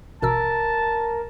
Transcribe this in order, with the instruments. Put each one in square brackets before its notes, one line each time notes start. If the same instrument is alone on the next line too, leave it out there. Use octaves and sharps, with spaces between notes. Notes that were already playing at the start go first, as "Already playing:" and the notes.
[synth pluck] A1 B2 E6 [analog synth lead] A#4 [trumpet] A5